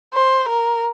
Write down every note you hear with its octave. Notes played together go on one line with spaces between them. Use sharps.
C5
A#4